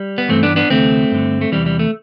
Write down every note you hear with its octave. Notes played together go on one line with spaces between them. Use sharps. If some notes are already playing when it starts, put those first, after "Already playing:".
Already playing: G3
B3
G2 E3 A3 C4
B3 D4
B3 D4
D2 C3 E3 A3 C4
G2 D3
A3
E2 C3 E3 G3
G3
A3